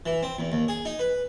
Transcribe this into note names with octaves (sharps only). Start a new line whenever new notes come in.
E3
C4
E2
D#2
G#4
D#4
B4